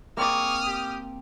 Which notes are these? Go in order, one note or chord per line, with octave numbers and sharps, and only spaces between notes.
A#3 C4 G#4 D5 C#6 D#6 F6
G4